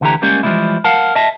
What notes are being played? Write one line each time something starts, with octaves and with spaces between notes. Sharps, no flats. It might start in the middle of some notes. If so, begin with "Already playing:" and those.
D2 D3 E3 A3 G4 A#5
G3 G#3 A#3 C#4 G4
E3 F3 G3 G#3 A#3 E4
A#4 F5 F#5 A5
D#5 E5 A5